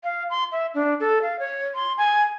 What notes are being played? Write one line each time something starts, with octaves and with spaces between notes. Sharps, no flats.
F5
C6
E5
D4
A4
F5
C#5
C6
G#5